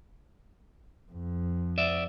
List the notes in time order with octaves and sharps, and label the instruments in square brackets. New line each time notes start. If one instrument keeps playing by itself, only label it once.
[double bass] F2
[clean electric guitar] D5 E5